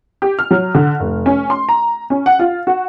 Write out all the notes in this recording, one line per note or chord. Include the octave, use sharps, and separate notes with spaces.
G4
F6
F#3
D3
F1
C#4
C6
A#5
C#4
F#5
F4
F#4